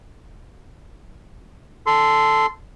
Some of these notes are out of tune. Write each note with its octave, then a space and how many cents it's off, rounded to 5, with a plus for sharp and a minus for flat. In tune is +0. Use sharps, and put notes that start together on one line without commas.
A4 +0 C6 -15